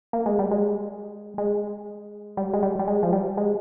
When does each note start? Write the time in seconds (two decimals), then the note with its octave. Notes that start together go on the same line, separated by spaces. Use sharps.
0.13 A#3
0.26 G#3
0.39 G3
0.51 G#3
1.38 G#3
2.37 G3
2.53 G#3
2.63 G3
2.79 G3
2.88 G#3
3.03 F3
3.13 G3
3.37 G#3